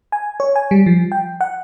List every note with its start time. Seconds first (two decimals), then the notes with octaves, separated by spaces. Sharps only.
0.12 G#5
0.40 C#5
0.56 G#5
0.71 G3
0.86 F3
1.12 G5
1.41 F#5